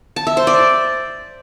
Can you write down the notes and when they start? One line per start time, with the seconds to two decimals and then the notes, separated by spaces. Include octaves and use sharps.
0.16 A5
0.27 E5
0.37 C5
0.47 D5